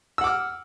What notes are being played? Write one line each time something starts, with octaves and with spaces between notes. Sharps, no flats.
F#5 D6 E6 F6